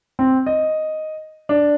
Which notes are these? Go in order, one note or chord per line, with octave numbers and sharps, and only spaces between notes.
C4
D#5
D4